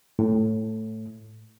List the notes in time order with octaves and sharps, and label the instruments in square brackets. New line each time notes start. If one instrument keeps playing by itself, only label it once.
[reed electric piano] A2